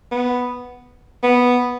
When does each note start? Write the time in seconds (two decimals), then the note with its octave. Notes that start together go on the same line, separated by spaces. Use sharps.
0.11 B3
1.23 B3